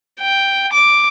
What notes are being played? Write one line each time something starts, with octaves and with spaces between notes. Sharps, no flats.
G5
D6